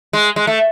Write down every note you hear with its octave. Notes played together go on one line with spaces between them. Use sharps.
G#3
G#3
A3